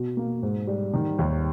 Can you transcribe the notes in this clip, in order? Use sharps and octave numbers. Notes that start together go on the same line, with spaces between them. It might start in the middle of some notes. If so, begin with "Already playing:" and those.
Already playing: B2
A#3
G#2
G3
D#3
D#2